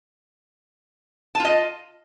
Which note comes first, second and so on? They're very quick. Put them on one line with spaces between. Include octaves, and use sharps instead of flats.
A5 F4 D#5